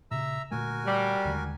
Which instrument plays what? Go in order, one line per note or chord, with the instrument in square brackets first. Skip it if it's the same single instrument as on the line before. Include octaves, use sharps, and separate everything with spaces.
[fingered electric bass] A#2 C#3 [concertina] E5 A#5 E6
[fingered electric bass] A#2 D3 A3 [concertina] F#4 A#4 G#5
[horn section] G3
[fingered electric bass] D#2 D3 G#3